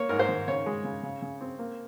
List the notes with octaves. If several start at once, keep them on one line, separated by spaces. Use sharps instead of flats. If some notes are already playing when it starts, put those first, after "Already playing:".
Already playing: A#3 C#5
G#2 A#4
C5
D#3
C#3 C#5
G#3
C#3
C#3
C#3
C4
A#3